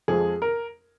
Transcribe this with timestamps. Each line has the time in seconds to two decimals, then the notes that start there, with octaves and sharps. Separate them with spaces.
0.08 F2 F3 G#3 G#4
0.42 A#4